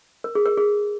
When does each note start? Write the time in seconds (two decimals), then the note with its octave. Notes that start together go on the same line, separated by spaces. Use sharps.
0.24 A#4
0.35 G#4
0.46 A#4
0.58 G#4